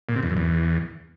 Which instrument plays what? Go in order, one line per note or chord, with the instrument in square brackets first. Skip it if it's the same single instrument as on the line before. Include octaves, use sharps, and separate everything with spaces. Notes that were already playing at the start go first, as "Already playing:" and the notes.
[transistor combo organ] A#2
C3
E2
F#2
E2